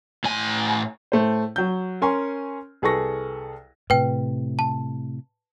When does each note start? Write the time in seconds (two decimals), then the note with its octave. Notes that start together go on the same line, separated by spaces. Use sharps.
0.24 A2 G#5
1.12 A2 A3 C5
1.56 F#3 G6
2.02 C#4 A#4 G#5 C6 C#6
2.82 C2 G#4 A4 B4 C#6 A#6
3.90 A2 C3 B4 G5
4.59 A5